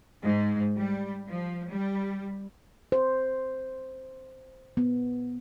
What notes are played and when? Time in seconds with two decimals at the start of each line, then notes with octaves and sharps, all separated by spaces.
0.22 G#2
0.76 G3
1.27 F3
1.70 G3
2.92 C5
4.77 B3